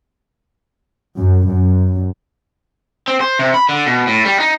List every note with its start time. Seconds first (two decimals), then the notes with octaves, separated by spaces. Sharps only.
1.18 F#2
1.49 F#2
3.08 C4
3.21 C5
3.39 C3
3.54 B5
3.69 D3
3.86 B2
4.07 A2
4.25 G3
4.40 D#4